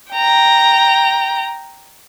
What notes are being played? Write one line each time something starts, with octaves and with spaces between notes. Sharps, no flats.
G5 A#5